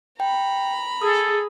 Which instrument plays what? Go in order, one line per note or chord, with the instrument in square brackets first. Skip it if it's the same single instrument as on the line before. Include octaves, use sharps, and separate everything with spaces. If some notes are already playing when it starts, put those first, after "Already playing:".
[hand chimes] G5 [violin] A#5 B5
[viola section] G#4 [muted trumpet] A4 [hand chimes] D#6